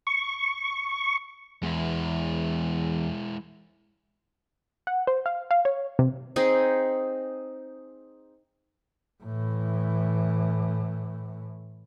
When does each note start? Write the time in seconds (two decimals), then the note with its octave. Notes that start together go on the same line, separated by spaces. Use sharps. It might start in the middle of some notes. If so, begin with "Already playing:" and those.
0.07 C#6
1.63 E2 G#3 E4
4.87 F#5
5.07 C5
5.26 F5
5.51 F5
5.65 C#5
5.99 C3
6.36 C4 D#4 G#4
9.24 A2 E3